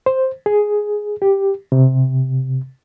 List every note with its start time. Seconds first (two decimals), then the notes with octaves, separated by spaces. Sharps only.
0.06 C5
0.46 G#4
1.22 G4
1.72 C3